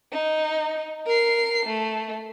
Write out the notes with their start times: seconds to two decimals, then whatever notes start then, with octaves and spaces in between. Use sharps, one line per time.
0.12 D#4
1.07 A#4 C7
1.66 A3